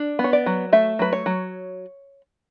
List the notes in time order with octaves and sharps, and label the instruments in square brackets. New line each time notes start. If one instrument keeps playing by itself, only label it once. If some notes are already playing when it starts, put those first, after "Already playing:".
Already playing: [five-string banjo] D4
B3
C#5
D5
F#3
A3 E5
F#3 B4
C#5
F#3